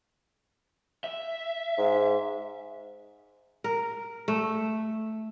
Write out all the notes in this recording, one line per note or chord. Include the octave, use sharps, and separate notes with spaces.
E5
G#2
A#4
A3